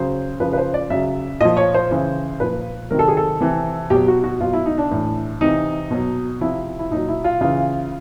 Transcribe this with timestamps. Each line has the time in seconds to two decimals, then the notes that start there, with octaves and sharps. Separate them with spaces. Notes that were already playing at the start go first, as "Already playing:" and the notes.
Already playing: C#3 F#3 C5
0.40 C#3 F3 B4
0.53 B4
0.58 C5
0.74 D5
0.90 C#3 F#3 E5
1.40 A#2 F3 D#5
1.57 C#5
1.74 C5
1.91 C#3 E3
2.40 A#2 F3 B4
2.91 C3 D#3 F#3 A#4
2.99 A4
3.08 G#4
3.17 A4
3.40 C3 E3
3.90 B2 F#3 G4
4.08 F#4
4.24 F#4
4.41 B2 F#3 F4
4.53 E4
4.66 D#4
4.78 D4
4.91 A2 E3
5.41 C3 E3 D#4
5.91 B2 F#3
6.41 C3 F3 E4
6.79 E4
6.91 A#2 F#3 D#4
7.09 E4
7.24 F4
7.41 C#3 E3 F4